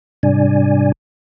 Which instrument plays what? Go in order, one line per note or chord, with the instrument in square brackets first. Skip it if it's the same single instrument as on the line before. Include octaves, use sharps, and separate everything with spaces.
[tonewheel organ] G#2 C3 G3 D4 D5 G#5